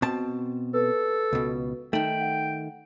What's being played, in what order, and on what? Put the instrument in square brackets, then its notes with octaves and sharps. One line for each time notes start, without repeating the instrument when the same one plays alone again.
[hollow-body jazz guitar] B2 C4 A5
[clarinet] A4 [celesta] B4
[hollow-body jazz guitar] C#2 B2
[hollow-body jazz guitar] D#3 A3 [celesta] D#4 F#7 [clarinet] G5
[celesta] F#5